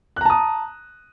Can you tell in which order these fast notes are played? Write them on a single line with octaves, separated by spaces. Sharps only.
F#6 A#5 A5 D#6